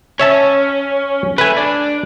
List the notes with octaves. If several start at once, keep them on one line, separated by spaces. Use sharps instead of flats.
C#4 C#5 E5 A5
A3 B4 G#5
D4